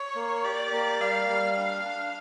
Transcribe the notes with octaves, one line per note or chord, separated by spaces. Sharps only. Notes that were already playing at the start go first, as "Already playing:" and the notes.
Already playing: C#5
A#3
G4 D5
A#3
G3 F5
G3
D4 F5
D4